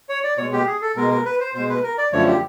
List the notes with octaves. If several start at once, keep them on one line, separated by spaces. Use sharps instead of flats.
C#5
D5
B2 G#3 C#5
G4
G#4
A4
B2 G#3 A#4
A#4
B4
C5
B2 G#3 C5
B4
A#4
D5
F#2 D3 F3 A3 C#5
G4